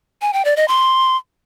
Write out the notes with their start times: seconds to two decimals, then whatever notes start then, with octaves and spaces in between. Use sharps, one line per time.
0.22 G#5
0.33 G5
0.45 D5
0.57 D#5
0.68 C6